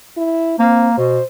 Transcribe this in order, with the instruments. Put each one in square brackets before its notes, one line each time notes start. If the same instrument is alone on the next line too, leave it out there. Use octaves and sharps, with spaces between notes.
[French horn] E4
[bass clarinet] A#3 [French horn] C4
[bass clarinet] B2 [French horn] C5